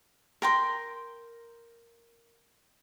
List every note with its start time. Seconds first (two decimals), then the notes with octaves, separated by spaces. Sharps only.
0.42 A#4 G5 C6